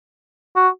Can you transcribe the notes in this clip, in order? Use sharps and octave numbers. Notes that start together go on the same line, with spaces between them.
F#4